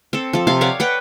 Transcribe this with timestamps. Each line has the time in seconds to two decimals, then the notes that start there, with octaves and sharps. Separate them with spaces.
0.13 C4 A4
0.33 F3 A4
0.47 C3 F4 F5
0.61 C#5 D5 F5 F#5
0.80 B4 F#5 G5